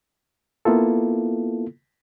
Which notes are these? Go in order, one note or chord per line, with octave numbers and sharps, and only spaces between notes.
A#3 B3 E4 F4 A4